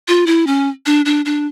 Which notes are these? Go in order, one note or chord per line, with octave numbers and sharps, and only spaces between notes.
F4
E4
C#4
D4
D4
D4